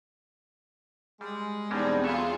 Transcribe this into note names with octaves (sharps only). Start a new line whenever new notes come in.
G3 G#3
E2 B2 G3 G#3 C4 D4 D#4
F#3 F4 G#4 A4 E5